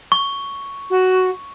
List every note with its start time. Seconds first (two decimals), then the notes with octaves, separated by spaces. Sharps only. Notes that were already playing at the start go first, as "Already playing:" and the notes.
0.12 C#6
0.90 F#4